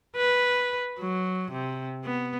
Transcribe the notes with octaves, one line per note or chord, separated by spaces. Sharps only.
B4
F#3
C3
B3